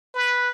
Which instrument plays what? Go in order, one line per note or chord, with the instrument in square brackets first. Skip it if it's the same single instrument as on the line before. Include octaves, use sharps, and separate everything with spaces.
[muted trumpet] B4